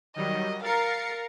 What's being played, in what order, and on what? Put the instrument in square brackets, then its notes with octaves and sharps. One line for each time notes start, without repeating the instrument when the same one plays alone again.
[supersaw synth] D#3 F#3 G3 [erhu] D#5
[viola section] A#4 [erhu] F5 [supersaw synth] A6 C7 C#7